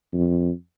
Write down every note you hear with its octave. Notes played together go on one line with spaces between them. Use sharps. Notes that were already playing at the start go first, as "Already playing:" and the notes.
F2